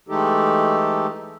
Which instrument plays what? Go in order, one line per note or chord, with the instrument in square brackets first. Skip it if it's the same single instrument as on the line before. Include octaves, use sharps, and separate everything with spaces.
[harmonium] E3 G#3 A3 D#4 G4 A4